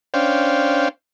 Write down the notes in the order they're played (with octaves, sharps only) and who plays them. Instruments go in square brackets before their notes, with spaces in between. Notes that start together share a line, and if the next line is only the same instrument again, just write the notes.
[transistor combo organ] C#4 D4 C5 F5 G5